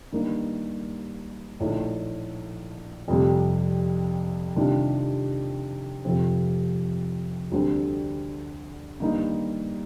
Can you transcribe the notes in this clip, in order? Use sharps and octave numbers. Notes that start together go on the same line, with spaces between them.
G2 D#3 A#3 D#4 A#4
A#1 A2 A3 D#4
F2 C3 G3
C3 D#3 G3 D4 F4
F2 C3 F3 C4
D2 D3 G3 C4
G2 D#3 A#3 D#4